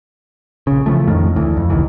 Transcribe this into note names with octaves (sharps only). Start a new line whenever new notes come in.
A#1 C#3
C#3 E3 F3 A3
F2 A2 D#3 A3
D2 E3
F2
G1 C#2 D#3 E3